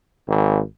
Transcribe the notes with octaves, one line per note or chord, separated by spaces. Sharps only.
G#1